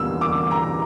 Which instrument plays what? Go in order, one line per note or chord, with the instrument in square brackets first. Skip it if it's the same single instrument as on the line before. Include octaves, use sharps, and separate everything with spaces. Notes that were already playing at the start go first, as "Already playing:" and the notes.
Already playing: [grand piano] E2 D3 G3 A#3 F4 [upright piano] E6
[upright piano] D6
A#5